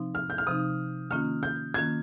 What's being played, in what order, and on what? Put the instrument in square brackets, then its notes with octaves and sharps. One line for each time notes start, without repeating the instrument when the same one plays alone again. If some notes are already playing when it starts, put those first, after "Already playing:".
Already playing: [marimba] C3 F3 C4 D#4
[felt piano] F6
G6
F6
[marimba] C3 F3 C4 D#4 [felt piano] D#6
[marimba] D#3 A#3 C#4 F4 [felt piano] F6
[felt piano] G6
[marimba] D#3 A#3 C#4 F4 [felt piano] G#6